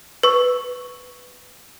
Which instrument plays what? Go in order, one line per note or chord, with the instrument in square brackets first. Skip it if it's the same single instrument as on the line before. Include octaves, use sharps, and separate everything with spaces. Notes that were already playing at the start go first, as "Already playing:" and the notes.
[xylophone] B4 C#6